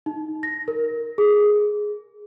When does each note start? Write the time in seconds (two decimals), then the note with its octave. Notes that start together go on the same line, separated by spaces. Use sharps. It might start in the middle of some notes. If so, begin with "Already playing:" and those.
0.06 D#4
0.43 A#6
0.68 A#4
1.18 G#4